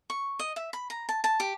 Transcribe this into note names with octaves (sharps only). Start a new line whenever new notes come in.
C#6
D#5
E5
B5
A#5
A5
A5
G4